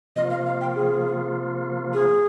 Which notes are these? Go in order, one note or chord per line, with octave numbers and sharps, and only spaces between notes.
C3 F3 A#3 F4 D#5
F5
F5
G5
G#4
G#4